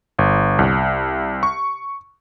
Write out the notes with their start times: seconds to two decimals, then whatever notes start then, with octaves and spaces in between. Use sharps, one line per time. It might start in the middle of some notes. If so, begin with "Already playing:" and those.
0.19 G1
0.59 C2
1.43 C#6